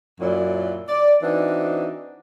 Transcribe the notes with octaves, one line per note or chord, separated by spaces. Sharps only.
F#2 A#2 F#3 E4 D5
D5
E3 C4 D4 D#4 F#4